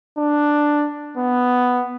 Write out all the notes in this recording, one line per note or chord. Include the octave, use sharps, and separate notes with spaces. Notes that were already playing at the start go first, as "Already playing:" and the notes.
D4
B3